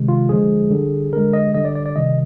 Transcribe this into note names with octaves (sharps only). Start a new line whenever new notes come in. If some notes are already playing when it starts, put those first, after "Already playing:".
Already playing: C3 D#3 G#3
F4
D3 F3 G#3 G#4
D3 G3
D3 G#3 A#4
D#5
D3 G3 D#5
D5
D5
D5
C3 D#3 G3 D#5